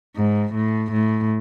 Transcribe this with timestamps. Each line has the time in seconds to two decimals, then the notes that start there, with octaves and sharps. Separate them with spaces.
0.16 G#2
0.54 A2
0.92 A2